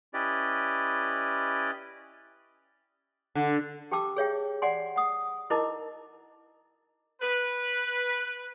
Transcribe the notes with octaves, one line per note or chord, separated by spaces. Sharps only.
C#4 E4 G4 B4 D5 D#5
D3
G4 G5 A5 D6 E6
G#4 C#5 E5 G5
D5 F#5 G#5 C6
F#5 D#6
D#4 E4 A#4 D#5 A5 D6
B4